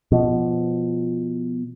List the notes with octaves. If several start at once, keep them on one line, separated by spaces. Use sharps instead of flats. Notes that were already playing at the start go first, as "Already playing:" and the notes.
B2 F3